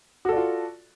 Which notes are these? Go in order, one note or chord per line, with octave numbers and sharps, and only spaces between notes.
F4 F#4 A4 D5